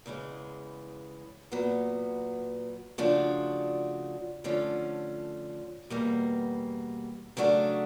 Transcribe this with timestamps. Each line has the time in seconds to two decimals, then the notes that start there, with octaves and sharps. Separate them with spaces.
0.06 E2 C#3 E3 G#3
1.52 A#2 F#3 B3
2.98 C#3 F3 A3 D4 F#4
4.44 D3 F3 A3 C#4
5.90 E2 B2 G3 A#3
7.37 C#3 F#3 A3 D4 F#4